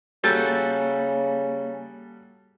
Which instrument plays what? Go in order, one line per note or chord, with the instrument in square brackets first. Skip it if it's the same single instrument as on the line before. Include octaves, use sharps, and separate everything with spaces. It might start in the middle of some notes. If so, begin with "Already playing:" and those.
[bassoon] C#3 [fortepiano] G3 F#4 A4 [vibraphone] A#3 G#5 [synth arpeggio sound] G6 A6